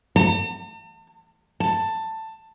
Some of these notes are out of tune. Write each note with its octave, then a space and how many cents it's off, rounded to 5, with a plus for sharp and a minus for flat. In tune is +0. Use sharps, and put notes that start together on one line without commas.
A5 +45
A5 +15